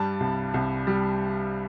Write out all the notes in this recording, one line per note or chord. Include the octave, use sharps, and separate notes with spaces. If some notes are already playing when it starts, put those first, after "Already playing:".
Already playing: G2 G3 A5
C2
C2
G3